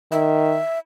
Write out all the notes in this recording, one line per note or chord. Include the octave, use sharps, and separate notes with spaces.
D#3 E5